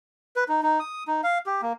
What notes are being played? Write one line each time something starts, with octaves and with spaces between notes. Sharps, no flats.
B4
D#4
D#4
D#6
D#4
F5
G4
A#3